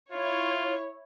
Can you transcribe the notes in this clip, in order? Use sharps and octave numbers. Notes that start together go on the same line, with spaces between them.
E4 F4 C#5